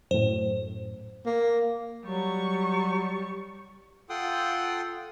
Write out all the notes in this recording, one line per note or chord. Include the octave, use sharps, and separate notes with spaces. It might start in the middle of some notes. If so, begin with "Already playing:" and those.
F#2 A2 C5
A#3
F#3 G3 C#6
F4 A4 F#5 G5 C6 D#6